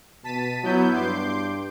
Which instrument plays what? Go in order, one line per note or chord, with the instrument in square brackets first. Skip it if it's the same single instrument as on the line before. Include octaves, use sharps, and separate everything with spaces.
[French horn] B2 [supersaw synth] A5 B6 D#7
[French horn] F#3 [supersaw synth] B3 E4 G6
[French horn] G2 [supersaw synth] C6 D6 G6